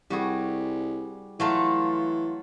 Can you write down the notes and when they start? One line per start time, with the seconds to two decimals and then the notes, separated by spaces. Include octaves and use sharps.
0.10 C2 G3 F#4 G#4
1.40 E3 F#3 A3 F4